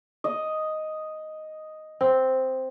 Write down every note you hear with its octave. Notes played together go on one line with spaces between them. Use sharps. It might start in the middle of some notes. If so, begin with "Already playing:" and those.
D#5
C4